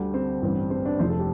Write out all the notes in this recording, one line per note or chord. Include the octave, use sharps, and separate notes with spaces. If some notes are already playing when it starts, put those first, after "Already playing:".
Already playing: D2 D3 G3
C4
A1 G2 G3
C4
D4
F1 F2 F3 A3 C5
A4
G4